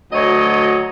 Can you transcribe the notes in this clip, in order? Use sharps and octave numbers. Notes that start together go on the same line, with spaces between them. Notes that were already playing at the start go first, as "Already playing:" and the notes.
D2 F#3 C#5 D#5